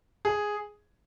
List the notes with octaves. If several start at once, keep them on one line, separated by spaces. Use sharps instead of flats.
G#4